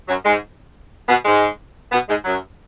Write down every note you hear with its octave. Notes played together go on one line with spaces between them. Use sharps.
F#2 F#3
G#2 G#3
B2 B3
G#2 G#3
B2 B3
G#2 G#3
F#2 F#3